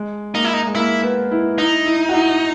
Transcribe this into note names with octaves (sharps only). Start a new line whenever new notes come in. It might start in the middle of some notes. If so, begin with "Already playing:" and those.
Already playing: G#3
A#3 D#4
E4
D#4
G#3
A#3 E4
B3
E4
D#4 E4
E4
F#4
E4